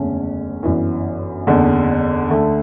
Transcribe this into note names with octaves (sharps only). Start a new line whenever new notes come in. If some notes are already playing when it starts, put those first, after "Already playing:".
Already playing: F#1 E2 D3 A3 C#4
G1 F#2 E3
F#1 E2 D3
D2 D3 A3